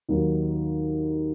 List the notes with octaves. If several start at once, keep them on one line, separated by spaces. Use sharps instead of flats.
D#2 D#3 F#3